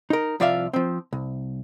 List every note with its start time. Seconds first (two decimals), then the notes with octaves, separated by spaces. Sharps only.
0.10 D#4 A#4
0.40 C2 F3 F4 D5 E5 F5
0.73 F3 C4
1.13 C2